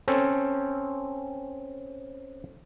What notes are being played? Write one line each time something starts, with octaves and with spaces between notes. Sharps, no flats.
C4 C#4 A4